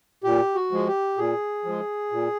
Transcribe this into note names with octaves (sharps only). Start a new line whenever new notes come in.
A#2 G4
F#4
F3 G#3
G4
A#2 G#4
F3 G#3
A#2